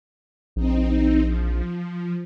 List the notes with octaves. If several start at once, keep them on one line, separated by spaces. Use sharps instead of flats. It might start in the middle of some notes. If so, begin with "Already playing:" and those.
A#1 C4 D#4
F3